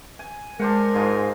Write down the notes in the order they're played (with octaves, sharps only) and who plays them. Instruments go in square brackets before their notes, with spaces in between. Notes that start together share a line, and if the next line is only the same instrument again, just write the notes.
[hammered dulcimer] G#5
[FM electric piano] G#3 [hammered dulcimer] D4 C5 F#5 [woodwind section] A#4
[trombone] G#2 [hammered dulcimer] F4 G#4